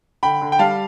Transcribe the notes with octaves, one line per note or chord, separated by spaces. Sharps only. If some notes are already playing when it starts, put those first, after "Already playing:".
D3 G5 B5
D3
G5
G3 F5 A5